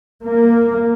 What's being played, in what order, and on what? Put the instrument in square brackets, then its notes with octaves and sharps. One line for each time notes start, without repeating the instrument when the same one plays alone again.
[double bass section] A#3